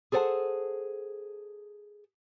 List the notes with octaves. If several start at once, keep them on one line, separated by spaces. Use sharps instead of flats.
G#4 A4 C5 C#5 F#5 A5